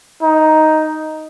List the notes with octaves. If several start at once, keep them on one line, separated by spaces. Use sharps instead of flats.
D#4